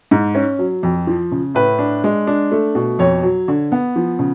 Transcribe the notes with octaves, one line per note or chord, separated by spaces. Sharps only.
G#2
C#4
F#3
F2
F3
C#3
A2 B4
D4
G#3
D4
A3
B2
F2 C#5
F#3
D3
B3
F3
C#3